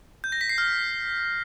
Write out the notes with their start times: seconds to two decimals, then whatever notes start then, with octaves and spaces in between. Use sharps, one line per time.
0.24 G6
0.32 A#6
0.41 B6
0.49 C7
0.58 F6